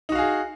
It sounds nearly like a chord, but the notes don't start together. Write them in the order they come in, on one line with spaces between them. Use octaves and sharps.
D#4 F#4 F5 G#4